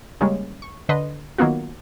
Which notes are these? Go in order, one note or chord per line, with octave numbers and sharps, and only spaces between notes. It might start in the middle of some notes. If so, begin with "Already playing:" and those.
C#3 G3 G#3 A#3 C#4
C#6
D3 B4 D#5 C6
D#3 F#3 A#3 B3 F4 F#4